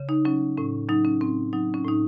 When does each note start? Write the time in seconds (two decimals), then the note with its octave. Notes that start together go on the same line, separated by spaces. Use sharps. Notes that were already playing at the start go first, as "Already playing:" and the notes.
Already playing: C#3
0.09 D#4
0.25 F#3 C#4
0.57 A2 C#4
0.89 F#3 D#4
1.05 C#4
1.21 A2 C4
1.53 F#3 D#4
1.74 C#4
1.85 A2 D#4